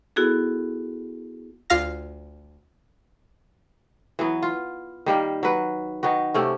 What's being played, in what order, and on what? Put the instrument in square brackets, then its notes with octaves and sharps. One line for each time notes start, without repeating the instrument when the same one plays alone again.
[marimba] B3 E4 F#4 G#4 A4
[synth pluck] D2 F4 F5 A#6
[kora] E3 F#3 B3
F4
D#3 G3 A#3
F#3 B4
D#3 B3 F#4
C3 A3 C#4